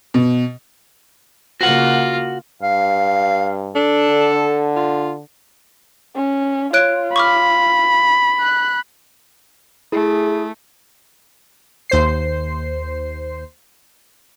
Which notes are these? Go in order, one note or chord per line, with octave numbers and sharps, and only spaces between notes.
B2
C#3 A#3 F4 F#4 F#5
G2 F5
D4 A4
D3
F4
C#4
F4 C#5 F#6 D7
B5 C#6 D6 F6
F#6
A3 E4 G#4
D#2 C5 C7